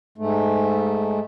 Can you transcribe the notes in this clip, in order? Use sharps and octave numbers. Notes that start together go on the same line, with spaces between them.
G#2 A3